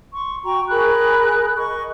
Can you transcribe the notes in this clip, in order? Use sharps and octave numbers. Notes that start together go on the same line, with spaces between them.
C6 C#6
F#4 G5 A#5 C#6
G#4 A#4 B5 F#6
D#5 C#6